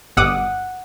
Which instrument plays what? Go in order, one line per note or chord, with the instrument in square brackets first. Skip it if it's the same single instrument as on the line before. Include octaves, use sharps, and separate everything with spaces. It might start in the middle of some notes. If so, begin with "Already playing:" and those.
[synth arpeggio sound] G1 D6 D#6 [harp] F#5